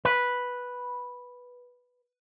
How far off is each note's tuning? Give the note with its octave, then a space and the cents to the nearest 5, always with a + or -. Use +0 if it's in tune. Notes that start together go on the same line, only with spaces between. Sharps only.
B4 -5